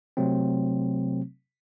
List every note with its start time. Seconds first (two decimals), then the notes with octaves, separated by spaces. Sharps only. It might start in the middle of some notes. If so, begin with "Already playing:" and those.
0.17 C3 F#3 A3 C4